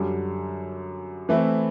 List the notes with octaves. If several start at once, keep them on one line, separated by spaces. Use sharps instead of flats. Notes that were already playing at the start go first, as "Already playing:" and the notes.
Already playing: F#2 D3 G3
E3 A3 C4 E4